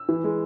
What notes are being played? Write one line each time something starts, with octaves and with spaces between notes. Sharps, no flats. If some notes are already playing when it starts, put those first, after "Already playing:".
Already playing: E6
E3
G#3